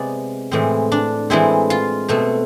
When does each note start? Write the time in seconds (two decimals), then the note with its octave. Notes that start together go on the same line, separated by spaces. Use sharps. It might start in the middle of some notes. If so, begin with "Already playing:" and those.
Already playing: C3 G#3 B3 D5
0.52 A2 E3 G#3 C4
0.92 D4
1.30 A2 E3 G#3 C4 E4
1.70 F4
2.08 B2 A3 C4